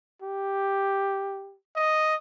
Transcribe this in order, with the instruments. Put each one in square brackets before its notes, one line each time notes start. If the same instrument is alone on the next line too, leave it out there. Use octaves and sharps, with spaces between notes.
[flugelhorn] G4
[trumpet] D#5